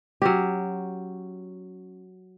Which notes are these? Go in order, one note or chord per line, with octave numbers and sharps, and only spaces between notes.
F#3 C#4 G4